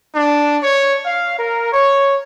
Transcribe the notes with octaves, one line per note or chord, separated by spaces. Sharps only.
D4
C#5
F5
A#4
C#5